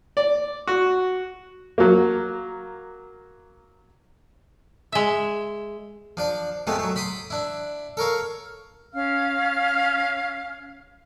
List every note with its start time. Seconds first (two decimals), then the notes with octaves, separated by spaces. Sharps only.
0.17 D5
0.67 F#4
1.78 F#3 A#3
4.92 G#3 E5
6.17 F3 D4 D5
6.67 C3 F3 G#3 A3 B3
6.79 F#3 A3
6.96 B5 C6 D6 D#6
7.30 D4 E4
7.97 A4 A#4 C#5 F5
8.93 C#4 F5 F6